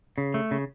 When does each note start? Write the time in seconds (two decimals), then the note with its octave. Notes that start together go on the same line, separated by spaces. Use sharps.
0.18 C#3
0.34 A3
0.51 C#3